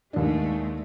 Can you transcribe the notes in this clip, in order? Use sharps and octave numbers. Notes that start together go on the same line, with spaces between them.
D#2 G#3 A3 D4